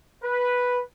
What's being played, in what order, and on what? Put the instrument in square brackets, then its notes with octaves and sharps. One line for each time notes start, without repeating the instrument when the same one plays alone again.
[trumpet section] B4